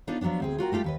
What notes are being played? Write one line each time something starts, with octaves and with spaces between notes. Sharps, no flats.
B3 D4 D#4 F4 A4
F3 F#3 A3 B3 D4
D2 C4 G#4
F4 F#4 A#4 G5
G3 A3 F4 G4 A4
D#2 B4 D#5